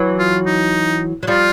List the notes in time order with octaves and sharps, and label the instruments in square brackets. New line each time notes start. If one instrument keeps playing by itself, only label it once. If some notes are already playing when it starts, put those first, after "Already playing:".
Already playing: [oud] E3 F#3
[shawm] F4
D#4
[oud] F#3
[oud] F3 G3 [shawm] F4